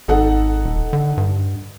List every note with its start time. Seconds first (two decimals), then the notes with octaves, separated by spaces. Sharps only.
0.08 G#1 D#4 A4 F#5
0.64 D#1
0.93 D3
1.17 G2